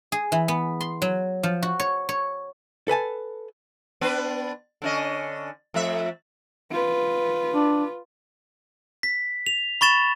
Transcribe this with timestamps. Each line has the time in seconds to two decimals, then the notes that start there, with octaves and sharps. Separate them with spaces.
0.12 G#4
0.32 E3
0.48 B3
0.81 C6
1.02 F#3
1.43 F3
1.63 F#4
1.80 C#5
2.09 C#5
2.88 A4 B4 G#5 A5
4.01 B3 D4 B4
4.82 D3 C#4 D#5
5.74 F2 A3 E5
6.71 F4 B4
7.54 D4
9.03 B6
9.47 F7
9.81 B5 C#6 A6 E7